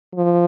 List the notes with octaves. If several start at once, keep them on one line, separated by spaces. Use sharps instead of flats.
F3